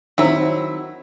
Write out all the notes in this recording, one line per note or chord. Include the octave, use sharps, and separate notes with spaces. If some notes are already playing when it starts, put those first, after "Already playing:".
D#3 F#3 C4 E4